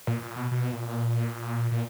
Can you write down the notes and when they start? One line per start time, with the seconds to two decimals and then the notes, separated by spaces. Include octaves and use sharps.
0.07 A#2
0.22 A#2
0.36 B2
0.51 B2
0.73 A#2
1.71 A#2